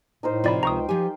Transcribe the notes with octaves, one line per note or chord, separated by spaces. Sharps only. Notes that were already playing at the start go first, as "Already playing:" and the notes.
A2 D#4 A#4 C5
C3 F3 F4 D5 B5
C#2 G5 A#5 C#6 D#6
F3 G4 G#5